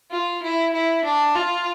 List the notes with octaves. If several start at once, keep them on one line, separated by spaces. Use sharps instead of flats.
F4
E4
E4
D4
F4